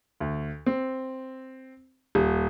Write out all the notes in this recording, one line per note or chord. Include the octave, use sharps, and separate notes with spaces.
D2
C4
D#1